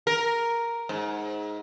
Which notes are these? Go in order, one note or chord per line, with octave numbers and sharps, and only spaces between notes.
A#4
G#2